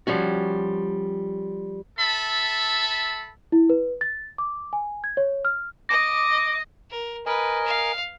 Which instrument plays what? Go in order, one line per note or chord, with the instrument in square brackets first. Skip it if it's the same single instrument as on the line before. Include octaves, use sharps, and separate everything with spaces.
[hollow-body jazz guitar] F3 G3 C#4 F#4
[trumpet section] A4 E5 A5 B5
[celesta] E4
B4
A6
D6
G#5
G#6
C#5
F6
[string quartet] D#5 [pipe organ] D6 [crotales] A#6
[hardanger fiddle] A#4
[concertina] A#4 D#5 G#5 [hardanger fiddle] B4
[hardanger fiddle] F5